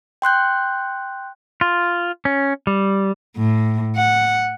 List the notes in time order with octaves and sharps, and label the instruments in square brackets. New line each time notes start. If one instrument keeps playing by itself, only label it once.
[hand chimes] G5 C6 F#6 G6
[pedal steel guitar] F4
C#4
G3
[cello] A2
F#5